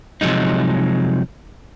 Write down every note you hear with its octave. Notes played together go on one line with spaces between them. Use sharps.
C3 F3 F#3 G#3 D#4